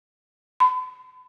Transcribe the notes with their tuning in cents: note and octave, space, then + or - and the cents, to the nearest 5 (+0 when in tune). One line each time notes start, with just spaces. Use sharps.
B5 +40